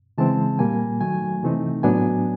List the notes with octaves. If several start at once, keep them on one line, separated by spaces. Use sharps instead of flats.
C#3 E3 G#3 C4 A5
A#2 G3 A#3 G#5
D#3 F#3 A3 G#5
C3 E3 A3 C4 D#4
A2 F#3 B3 D4 G#5